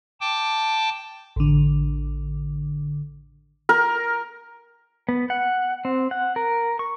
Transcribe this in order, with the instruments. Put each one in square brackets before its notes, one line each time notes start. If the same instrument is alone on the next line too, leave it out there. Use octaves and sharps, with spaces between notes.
[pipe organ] G5 A5 D6
[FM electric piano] A1 D3
[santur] A#4
[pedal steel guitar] B3
F#5
C4
F#5
A#4
C#6